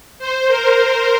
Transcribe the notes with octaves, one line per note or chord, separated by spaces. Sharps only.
C5
A#4
C5